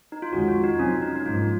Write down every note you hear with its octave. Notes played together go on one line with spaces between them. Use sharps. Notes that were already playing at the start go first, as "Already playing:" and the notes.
D#4
F4
F2 D#3 G#3 C#4 F#4
F4
D#4
C3 F#3 C4 C#4
D#4
D#4
G#2 F3 A#3 F4